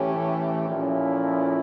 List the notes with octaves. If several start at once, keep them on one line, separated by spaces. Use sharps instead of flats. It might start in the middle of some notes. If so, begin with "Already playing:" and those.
Already playing: A2 E3 A3 C#4 G4
A#2 F3 A3 C#4 E4